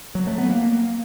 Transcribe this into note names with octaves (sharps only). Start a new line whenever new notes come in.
F#3
A3
B3
A#3